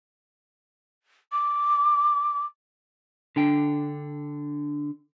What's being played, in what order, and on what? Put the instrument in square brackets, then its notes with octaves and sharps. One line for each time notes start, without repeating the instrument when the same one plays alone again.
[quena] D6
[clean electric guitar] D3 D4 G5